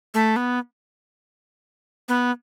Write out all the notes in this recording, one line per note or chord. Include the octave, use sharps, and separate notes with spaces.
A3
B3
B3